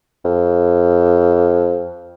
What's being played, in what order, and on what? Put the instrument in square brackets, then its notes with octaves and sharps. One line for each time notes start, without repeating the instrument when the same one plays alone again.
[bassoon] F2